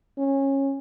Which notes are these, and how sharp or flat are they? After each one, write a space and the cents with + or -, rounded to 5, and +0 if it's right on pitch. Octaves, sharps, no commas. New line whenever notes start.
C#4 -20